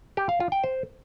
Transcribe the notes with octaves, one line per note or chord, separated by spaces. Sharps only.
G4
F5
F4
G5
C5